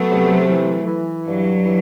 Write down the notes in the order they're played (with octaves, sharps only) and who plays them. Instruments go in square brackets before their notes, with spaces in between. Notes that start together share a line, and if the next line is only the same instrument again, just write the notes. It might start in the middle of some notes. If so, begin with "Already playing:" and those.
Already playing: [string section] F#3 A3 [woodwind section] B3
[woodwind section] C3
E3
E3
[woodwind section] G2 [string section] F#3
[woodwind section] E3